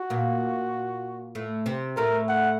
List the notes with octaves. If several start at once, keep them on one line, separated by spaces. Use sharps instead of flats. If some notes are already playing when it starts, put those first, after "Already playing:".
Already playing: F#4
A#2 A#3
A2 A3
C3 C4
A2 A3 A#4
F#5